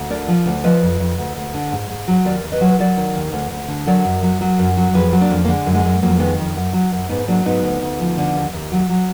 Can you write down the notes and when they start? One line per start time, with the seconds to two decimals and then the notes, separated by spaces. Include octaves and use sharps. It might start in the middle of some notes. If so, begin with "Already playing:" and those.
Already playing: D2
0.10 D3 A#4 D5
0.28 F3
0.46 D2
0.64 F3 B4 D#5
0.82 F2
1.00 F2
1.18 D2
1.36 D2
1.54 D3
1.72 G#2
1.89 G#2
2.08 F#3
2.25 D#2 A#4 D5
2.44 D#2
2.52 B4 D#5
2.61 F#3
2.69 B4
2.79 F#3 A#4 D5
2.97 D#3
3.15 D#2
3.33 D2
3.51 D2
3.68 D3
3.87 F#3 A#4 D5
4.04 F#2
4.23 F#3
4.41 F#3
4.59 F#2
4.77 F#3
4.94 F2 G#4 B4
5.12 F#3
5.21 A#3 D4
5.30 F2
5.45 A#3
5.48 D3 G#3
5.66 F#2
5.75 G#3
5.85 F#2
6.02 F2 F#3 A#3
6.16 A#3
6.19 D#3 G#3 B3
6.39 F2
6.56 F#2
6.73 F#3
6.92 F#2
7.09 G#2 B3 D#4
7.28 F#3 A#3 D4
7.45 G#2 B3 D#4
7.63 D2
7.82 D2
8.00 F3
8.18 D3
8.35 D#2
8.53 D#2
8.72 F#3
8.89 F#3